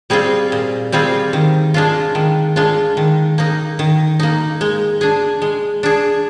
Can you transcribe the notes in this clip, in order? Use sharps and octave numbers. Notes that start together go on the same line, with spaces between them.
G3 C4 F4 G#4
A#2
G3 C4 F4 G#4
D#3
G#3 D4 F4
D#3
G#3 D4 F4
D#3
A#3 D#4
D#3
A#3 D#4
G#3
D4 G#4
G#3
D4 G#4